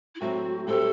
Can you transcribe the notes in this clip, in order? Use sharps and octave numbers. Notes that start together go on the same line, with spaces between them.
E4
A2 F#3 A3 C4 F#4
A2 G3 C4 G4 A4 C5